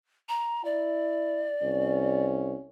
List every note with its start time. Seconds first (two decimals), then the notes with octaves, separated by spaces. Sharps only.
0.29 A#5
0.65 E4 D5
1.62 C2 C#4